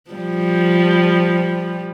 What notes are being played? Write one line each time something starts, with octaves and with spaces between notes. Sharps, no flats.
F3 G3